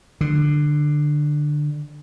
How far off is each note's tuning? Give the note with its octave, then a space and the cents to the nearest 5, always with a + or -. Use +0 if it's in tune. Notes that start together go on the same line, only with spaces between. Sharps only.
D3 +15